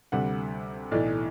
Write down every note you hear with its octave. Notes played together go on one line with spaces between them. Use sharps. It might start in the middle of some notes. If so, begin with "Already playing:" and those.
D2 C3 G3 F#5
B1 A2 E3 D5